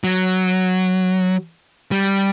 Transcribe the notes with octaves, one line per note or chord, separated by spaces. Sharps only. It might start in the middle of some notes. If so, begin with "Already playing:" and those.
F#3
G3